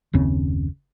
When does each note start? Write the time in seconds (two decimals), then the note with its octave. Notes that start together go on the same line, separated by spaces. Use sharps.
0.13 F#1 D#2 C#3 C4